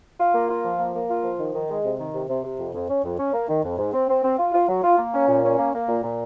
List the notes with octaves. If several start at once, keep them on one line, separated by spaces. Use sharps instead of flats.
F4
A#3
F4
F3
A#3
A#3
F4
F3
D#3
D#3
G#3
C3
D#3
C3
C3
C3
F2
F2
C#4
F2
C#4
A#3
D#3
F2
G#2
C4
C4
C4
F4
F4
F#3
F4
A#3
C#4
A#2
C#4
A#3
A#3
A#2
A#2